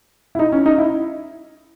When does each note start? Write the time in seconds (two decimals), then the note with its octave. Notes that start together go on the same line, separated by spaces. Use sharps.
0.35 E4
0.39 D#4
0.52 C#4
0.66 D#4
0.78 E4